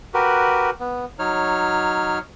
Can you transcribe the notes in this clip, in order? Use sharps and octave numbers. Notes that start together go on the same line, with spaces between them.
F#4 G4 A#4 B4
B3
F#3 D#4 C#5 F6